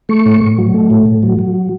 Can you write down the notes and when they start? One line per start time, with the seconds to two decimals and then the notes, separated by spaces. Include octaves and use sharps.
0.09 A3 C#6
0.26 A2
0.41 A2
0.58 F#3
0.74 A3
0.90 A2
1.06 A2
1.23 F#3
1.39 F#3